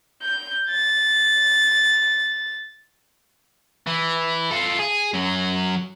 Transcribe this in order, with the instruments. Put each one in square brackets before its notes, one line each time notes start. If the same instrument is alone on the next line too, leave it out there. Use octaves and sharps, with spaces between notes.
[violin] G6
A6
[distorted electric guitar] E3
F4 A4
G#4
F#2 F#3